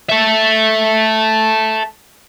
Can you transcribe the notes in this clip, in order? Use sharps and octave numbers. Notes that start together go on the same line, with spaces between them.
A4 E5